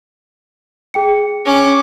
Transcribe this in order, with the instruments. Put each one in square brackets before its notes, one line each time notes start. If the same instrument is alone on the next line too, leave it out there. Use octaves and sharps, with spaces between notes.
[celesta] G#4 G5 C#7
[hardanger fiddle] C#4 D6